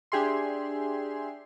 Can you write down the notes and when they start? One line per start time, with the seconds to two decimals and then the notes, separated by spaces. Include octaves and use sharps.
0.12 D4 G4 G#4 E5 C6